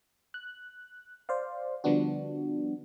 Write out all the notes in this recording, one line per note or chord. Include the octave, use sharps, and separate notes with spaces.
F#6
C5 D5 F5
D3 F3 G3 B3 D4 F#4